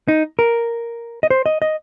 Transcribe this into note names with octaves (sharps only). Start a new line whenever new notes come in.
D#4
A#4
D#5
C5
D#5
D#5